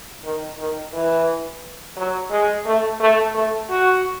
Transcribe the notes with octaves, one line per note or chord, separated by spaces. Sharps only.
D#3
D#3
E3
F#3
G#3
A3
A3
A3
F#4